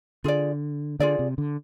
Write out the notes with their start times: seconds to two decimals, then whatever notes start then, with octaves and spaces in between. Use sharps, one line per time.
0.24 D3 F4 G#4 D5
1.00 D3 F4 G#4 D5
1.19 C3
1.38 D3